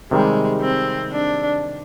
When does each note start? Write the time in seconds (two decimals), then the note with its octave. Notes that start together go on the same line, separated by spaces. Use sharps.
0.11 C3 D#3 G3 G#3
0.61 C4
1.12 D4